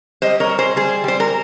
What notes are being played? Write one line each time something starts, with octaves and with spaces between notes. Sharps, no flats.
G3 C5 D#5
A#4 C#5
G3
G#4 C5
G3 G#4 C5
G3 C5
A#4